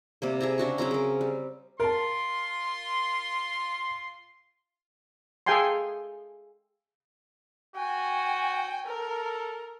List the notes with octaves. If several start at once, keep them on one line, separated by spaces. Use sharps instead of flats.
C3 G3 A#3
G#4 E5 A5 A#5
C#3 D4 F#4 C#6
C#3 F#3 C4 A#5
G#4 A#4
G3
F4 A#4 A5 C6
G#4 A4 F5 G5 G#5 C6
F#4 G5 G#5
A4 A#4